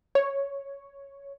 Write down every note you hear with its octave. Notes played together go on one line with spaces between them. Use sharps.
C#5